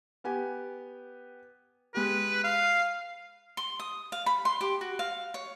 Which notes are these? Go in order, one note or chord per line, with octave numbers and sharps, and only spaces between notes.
B3 G4 G#5
G#3 G4 B4
F5
C6
D#6
F5
B5
C6
G4
F#4
F5
C#5